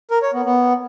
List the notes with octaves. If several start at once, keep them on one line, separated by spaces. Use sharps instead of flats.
A#4
C#5
B3
B3